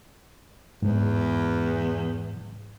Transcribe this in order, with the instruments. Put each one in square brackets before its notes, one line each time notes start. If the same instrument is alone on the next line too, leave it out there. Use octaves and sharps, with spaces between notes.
[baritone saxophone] E2 [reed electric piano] G#2